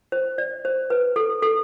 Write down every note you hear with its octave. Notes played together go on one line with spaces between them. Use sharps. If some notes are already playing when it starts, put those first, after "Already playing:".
C5
D5
C5
B4
A4
A4